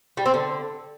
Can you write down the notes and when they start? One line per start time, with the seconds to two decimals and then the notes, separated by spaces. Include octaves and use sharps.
0.17 G3
0.26 C4
0.34 D3